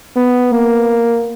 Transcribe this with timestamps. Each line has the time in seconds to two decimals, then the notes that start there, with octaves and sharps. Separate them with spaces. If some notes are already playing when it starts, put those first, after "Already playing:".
0.16 B3
0.52 A#3